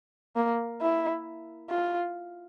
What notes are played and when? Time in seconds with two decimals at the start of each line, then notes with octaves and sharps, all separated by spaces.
0.36 A#3
0.81 E4
1.70 F4